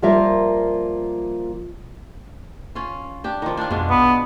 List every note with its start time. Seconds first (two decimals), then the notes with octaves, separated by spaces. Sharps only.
0.02 F3 G3 A#3 F4 A#4 E5
2.75 C#4 F4
3.24 D4 G4
3.42 D#3 F3
3.57 D4 F4
3.71 F2 B2 G#3 D4
3.90 A#1 B3